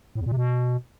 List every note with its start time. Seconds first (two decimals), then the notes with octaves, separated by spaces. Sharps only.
0.15 A2
0.21 E2
0.26 A#2
0.32 C3
0.37 B2